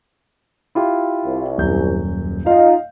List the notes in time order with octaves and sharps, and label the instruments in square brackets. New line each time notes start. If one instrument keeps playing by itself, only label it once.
[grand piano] E4 F4 G4
[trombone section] C2
[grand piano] D#1 F#2 G6
[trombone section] D#4 F4 [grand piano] D#5 F5